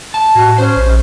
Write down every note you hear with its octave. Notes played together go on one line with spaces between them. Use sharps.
A5
A2 F#4
C#4 C5
A#1